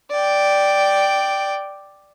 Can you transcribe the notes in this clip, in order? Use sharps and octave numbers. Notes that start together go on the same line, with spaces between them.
D5 G5